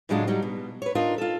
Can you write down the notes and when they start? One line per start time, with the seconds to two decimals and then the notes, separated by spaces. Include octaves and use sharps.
0.09 A2 C#3 F#3 G#3 D4 F4
0.27 F#3 G3 D#4
0.42 B2
0.82 B4 C#5
0.95 D4 D#4 F4 A#4 D#5
1.18 F4 A4